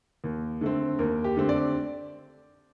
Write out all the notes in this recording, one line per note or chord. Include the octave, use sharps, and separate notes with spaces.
D#2
D3 A3 C4
D#2 A#4
G4
D3 A3 C4
D5